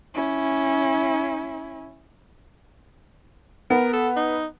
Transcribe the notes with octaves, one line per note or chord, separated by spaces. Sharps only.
C#4 E4
B3 A#4
A4
D#4